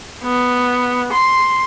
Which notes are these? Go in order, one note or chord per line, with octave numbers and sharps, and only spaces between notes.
B3
C6